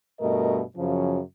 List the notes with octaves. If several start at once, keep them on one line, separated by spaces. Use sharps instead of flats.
G2 B2 A3 A#4 D#5
F#2 C#3 F3